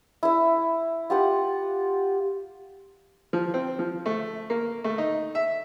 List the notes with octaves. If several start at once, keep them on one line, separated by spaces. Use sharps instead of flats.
E4 E5
F4 G4 F#5
F3
C4
F3
A3
A#3
A3
D#4
E5